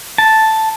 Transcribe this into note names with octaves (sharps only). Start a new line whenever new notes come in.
A5